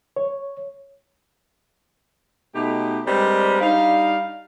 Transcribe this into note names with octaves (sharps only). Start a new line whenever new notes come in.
C#5
B2 A3 D#4 G4
G3 G#3 C4 D4 A#4 B4
G3 D4 D#4 F5